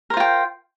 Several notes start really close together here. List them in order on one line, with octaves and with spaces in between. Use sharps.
A#4 C5 F4 G5